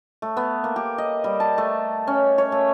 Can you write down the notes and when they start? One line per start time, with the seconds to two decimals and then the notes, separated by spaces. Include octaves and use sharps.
0.22 A3
0.37 B3
0.64 A#3
0.76 G4
0.98 D#5
1.24 G3
1.40 A5
1.58 A3
2.07 C#4
2.38 C#5
2.52 A3